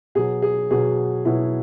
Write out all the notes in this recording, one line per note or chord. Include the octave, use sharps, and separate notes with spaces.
B2 F#3 G#4
G#4
B2 F#3 G#4
B2 F#3 E4